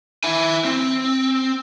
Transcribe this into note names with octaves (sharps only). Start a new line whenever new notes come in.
E4 G#5
C4